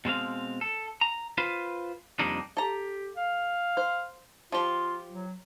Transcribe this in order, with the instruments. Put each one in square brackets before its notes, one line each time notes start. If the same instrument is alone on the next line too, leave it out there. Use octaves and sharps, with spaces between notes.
[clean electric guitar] B2 G#3 C4 F5
A4
A#5
F4 B4 C5
F2 C3 G3 A#3 D4 D#4
[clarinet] G4 [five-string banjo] A4 A#5
[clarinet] F5
[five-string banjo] C5
[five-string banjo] F3 G4 [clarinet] F4
[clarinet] F#3